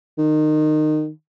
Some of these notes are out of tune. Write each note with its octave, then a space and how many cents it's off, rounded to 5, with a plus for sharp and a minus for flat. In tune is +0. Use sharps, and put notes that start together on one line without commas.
D#3 -20